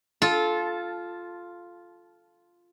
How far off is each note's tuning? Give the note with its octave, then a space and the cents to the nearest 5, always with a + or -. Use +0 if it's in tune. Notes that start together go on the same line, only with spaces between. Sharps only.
F4 +0 A4 -20